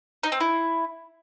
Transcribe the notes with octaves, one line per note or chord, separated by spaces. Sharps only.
D#4
C4
E4